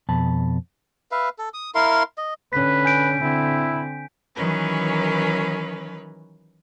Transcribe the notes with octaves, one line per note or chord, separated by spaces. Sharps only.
F2 B2 A5 B5
B4 E5 F5
A4
D#6
E4 A#4 F5 C6
D#5
D3 C#4 B4 B6
G#5 G6 D7
D3 C4 E4
D#3 E3 F#3 C#4 A#4 B4